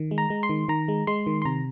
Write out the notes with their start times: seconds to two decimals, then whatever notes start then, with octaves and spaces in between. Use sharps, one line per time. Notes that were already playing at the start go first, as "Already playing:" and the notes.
Already playing: D#3
0.11 G#3
0.18 A#5
0.30 G#3
0.43 C6
0.49 D#3
0.68 D#3 A#5
0.88 G#3
1.07 G#3 C6
1.27 D#3
1.42 C6
1.45 C3 A#5